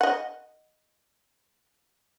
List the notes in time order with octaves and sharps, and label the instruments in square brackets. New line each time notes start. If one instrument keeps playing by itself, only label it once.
[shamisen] D#5 F#5